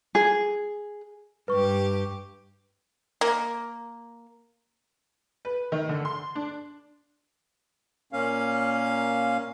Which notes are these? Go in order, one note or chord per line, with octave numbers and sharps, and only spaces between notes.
G#4
G2 G4 B4 C#6
A#3
B4
D#3
D3
C6
D4
A#2 A#3 C#4 F5